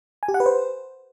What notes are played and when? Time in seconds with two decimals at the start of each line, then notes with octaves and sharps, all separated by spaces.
0.23 G#5
0.28 G4
0.34 F#5
0.40 B4
0.46 C5